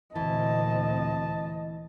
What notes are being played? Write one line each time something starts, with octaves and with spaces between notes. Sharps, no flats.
D2 A#2 E3 C4 D#5 A5